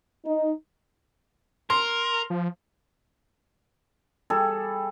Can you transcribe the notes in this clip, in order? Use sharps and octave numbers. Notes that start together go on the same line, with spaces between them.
D#4
A#4 C6
F3
G3 G#4 A4